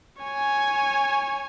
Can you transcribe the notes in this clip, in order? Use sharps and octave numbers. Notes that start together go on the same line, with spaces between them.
C#5 G#5